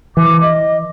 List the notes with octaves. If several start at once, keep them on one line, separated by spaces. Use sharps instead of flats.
E3 D6
D#5